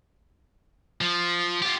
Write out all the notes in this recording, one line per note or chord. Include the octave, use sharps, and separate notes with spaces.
F3
F4 G4